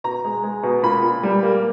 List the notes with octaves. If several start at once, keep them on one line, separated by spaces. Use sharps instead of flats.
B2 A#5
G#3
G#3
B2
A#2 B5
A#2
G3
A#3